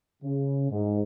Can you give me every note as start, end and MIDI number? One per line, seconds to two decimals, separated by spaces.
0.23 0.66 49
0.71 1.02 44